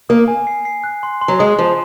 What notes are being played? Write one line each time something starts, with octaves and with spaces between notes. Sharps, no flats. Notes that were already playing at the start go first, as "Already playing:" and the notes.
A#3 D#6
G#5
C7
C7
F#6
C6
C6
F#3
G#3 D#6
F3 C6